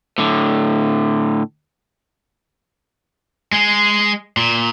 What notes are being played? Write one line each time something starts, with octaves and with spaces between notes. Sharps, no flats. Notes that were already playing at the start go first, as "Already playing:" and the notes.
A2 D3
G#3
A#2